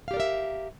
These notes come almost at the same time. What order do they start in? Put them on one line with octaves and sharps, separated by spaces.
F5 G4 D5 A#4 E5